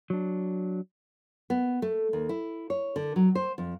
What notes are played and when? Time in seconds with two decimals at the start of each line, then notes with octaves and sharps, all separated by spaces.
0.10 F#3 D4
1.50 B3
1.82 A3
2.13 D#2
2.29 E4
2.70 C#5
2.96 D3
3.16 F#3
3.35 C5
3.58 F2